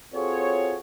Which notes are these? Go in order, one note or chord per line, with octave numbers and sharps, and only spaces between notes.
C4 F4 F#4 G#4 A4 C#5